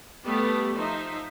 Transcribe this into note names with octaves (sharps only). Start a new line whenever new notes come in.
G3 A3 B3 G4
F3 D#4 C5 E5